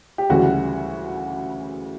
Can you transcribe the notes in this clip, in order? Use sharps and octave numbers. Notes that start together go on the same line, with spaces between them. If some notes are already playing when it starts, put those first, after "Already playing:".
G4
D2 C#3 E3 G3 F#4